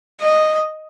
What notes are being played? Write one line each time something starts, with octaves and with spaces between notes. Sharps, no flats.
D#5